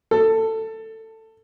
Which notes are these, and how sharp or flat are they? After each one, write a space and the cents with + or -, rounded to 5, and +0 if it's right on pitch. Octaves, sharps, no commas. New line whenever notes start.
A4 +15